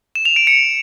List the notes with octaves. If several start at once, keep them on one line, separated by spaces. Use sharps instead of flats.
E7
F7
D7
C#7